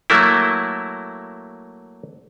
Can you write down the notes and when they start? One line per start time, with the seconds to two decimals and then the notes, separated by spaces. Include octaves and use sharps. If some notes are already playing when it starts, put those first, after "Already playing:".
0.10 F#3 A3 A#3 E4